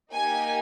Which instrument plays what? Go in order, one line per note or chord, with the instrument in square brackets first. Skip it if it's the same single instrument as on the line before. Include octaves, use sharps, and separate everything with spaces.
[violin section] A#3 D#4 G4 G#5